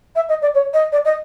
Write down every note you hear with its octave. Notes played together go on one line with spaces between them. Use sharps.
E5
D#5
D5
C#5
D#5
D5
D#5